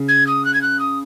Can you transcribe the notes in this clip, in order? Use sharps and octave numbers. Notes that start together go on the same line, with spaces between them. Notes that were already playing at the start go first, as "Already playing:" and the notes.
Already playing: C#3
G#6
D#6
F#6
G#6
F#6
D#6